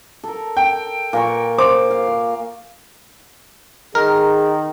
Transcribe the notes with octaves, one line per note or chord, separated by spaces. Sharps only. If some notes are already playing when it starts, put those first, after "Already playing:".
A4 A#4
G5
A#2 A#4 C#6
C5 D6
F5
D#3 G#4 A#4